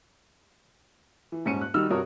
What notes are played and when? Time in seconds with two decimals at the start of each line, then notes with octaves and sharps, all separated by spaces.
1.32 E3
1.45 D#1 G#2 C#4 C#7 D#7
1.61 F#6
1.74 D#3 G3 D#4 F#4 E6 F6
1.90 G2 C3 F#4 A#4 C#5 D#6